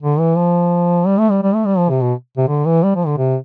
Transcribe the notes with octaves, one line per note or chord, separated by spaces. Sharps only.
D3
E3
F3
G3
A3
G3
G3
A3
G3
F3
C3
B2
C3
D3
E3
G3
F3
D3
C3